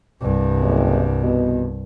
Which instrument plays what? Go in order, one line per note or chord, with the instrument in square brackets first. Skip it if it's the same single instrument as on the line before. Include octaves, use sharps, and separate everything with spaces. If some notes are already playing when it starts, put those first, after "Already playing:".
[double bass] C2 G2
[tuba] F#1
B2